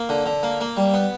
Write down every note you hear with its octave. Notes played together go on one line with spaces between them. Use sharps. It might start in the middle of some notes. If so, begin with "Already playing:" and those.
Already playing: A#3
D3
D3
A#3
A#3
G3
B3